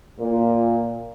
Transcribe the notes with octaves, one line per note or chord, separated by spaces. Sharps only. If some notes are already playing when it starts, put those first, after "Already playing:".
A#2